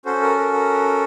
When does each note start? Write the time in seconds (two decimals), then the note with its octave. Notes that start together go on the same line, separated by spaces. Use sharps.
0.05 C#4 F#4 A4 C5
0.22 A#4
0.37 A#4
0.53 A#4